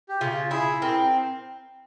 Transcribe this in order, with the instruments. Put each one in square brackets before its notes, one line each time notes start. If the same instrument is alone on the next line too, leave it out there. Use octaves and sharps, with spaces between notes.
[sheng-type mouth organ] G4
[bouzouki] C#3 [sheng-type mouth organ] F4
[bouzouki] E4 [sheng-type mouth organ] G#4
[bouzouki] C4 [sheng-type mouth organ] A#4